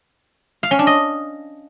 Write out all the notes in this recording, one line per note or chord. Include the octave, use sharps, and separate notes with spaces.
F5
C#4
D4
D#5